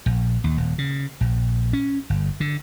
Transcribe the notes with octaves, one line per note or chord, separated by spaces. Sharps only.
A#1
D#2
D#1
C#3
A#1
C#4
G1
D3